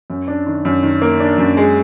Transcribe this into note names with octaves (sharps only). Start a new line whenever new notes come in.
F#2
D4
D#3
F#2
D#3
A#3
D4
F#2
G#3